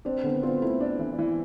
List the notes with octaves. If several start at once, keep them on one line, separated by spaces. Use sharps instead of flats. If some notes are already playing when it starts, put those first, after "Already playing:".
C4 D4
D3 B3
C4 F4
A3 E4
D4
E3
E3